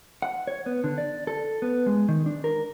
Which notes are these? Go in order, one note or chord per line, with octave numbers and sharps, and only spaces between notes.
F#5
C#5
B3
D3
D5
A4
B3
G#3
D#3
D4
A#4